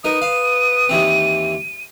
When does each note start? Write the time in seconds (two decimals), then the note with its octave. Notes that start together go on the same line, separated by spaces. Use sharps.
0.04 D#4 A#4 B4 D#6 D#7
0.22 F5
0.89 D#2 E3 C4